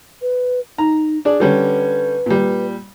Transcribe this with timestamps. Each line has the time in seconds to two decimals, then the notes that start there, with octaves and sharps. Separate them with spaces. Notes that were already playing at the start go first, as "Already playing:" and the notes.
0.22 B4
0.78 D#4 A#5
1.25 D4 G#4 D5
1.40 D3 G3 C#4 B4
2.26 A#2 G3